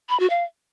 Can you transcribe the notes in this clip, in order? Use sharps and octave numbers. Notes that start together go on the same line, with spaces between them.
B5
F#4
F5